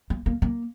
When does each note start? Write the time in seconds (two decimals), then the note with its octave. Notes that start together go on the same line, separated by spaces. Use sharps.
0.10 A#3
0.26 A#3
0.42 A#3